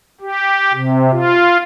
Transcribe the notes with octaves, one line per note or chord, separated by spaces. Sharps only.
G4
C3
F4